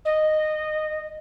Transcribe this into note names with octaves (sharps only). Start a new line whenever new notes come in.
D#5